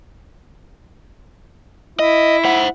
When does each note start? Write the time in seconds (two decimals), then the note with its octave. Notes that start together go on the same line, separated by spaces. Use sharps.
1.99 E4 D#5
2.45 C5 F#5